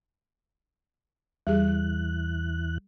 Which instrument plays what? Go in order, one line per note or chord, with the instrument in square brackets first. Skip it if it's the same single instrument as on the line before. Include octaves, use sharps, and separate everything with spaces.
[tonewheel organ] E2 E3 F#6 [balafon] G3 G4 G#4